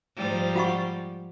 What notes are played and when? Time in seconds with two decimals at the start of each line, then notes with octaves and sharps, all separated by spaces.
0.16 G#2 F3 G3
0.56 F4 F#5 C#6